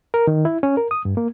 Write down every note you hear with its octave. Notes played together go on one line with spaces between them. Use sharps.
A#4
D#3
E4
C#4
A#4
D#6
G2
A#3